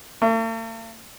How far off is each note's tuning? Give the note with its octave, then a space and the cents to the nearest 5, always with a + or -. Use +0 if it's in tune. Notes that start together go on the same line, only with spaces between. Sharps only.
A3 +45